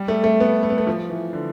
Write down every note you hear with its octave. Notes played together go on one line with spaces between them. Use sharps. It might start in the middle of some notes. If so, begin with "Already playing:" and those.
Already playing: G3
A3
A3
B3
A3
B3
A3
F3
E3
D3